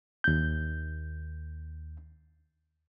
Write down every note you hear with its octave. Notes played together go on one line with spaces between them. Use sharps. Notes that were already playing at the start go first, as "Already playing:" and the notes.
D#2 G6